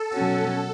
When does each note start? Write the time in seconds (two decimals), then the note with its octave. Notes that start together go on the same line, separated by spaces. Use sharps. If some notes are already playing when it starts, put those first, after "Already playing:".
Already playing: A4
0.11 B2 F#3 C#4 F#4 A4